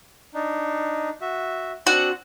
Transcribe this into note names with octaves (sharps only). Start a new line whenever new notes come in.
D4 D#4
F#4 E5
C4 D4 F#4 F#5